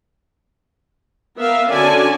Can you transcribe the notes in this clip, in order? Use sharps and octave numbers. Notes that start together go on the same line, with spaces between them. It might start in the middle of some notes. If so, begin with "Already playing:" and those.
B3 A#4 E5 F5
D3 C#4 F#4 D5 G#5 A5